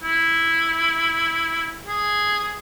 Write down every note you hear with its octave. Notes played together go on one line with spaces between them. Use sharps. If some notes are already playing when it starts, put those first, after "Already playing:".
E4
G#4